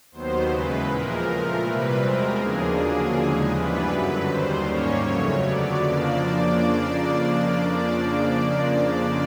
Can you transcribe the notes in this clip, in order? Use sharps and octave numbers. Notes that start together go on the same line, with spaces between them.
D#2 D#3 F#3 B3 C5
E2 C#3 E3 G#3 B4
A#2 F3 G#3 A#4
A#2 F3 A3
C3 E3 G3 C4 B4
E2 B2 G#3 C4 A#4
D#2 C#3 F3 A#3 D4 G#4
D3 F#3 A#3 D4 G#4
D#2 C#3 F3 G#3
G2 E3 G3 B3 D4 B4
F#2 D3 F#3
D#2 D#3 G3 C5
G#2 D#3 G3 A#3 C#4 C#5
F2 C#3 F#3 A3
D3 F#3 B3 D5
F2 C#3 F3 A#3 D4